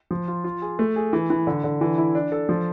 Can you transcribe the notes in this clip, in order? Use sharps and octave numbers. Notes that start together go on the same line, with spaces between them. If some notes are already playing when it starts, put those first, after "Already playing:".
F3
F4
F4
G#4
A3
G#4
E3
E3
D3
D3
E3
E4
D4
A4
F3